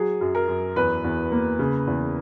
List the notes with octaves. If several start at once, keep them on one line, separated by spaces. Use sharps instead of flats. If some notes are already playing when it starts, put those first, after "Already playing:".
Already playing: F#3 G#4
F#2
A#4
F#2
E2 B4
E2
A#3
C#3
E2